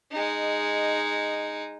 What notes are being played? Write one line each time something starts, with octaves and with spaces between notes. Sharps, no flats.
G#3 D#4